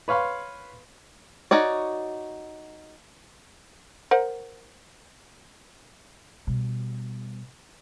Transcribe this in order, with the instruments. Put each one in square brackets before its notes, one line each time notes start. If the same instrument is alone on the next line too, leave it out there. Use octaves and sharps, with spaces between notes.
[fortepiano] B4 C#5 F5 B5 C6
[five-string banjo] D#4 F#4 C#5 D5
[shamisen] A#4 C5 F#5
[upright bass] B2 G3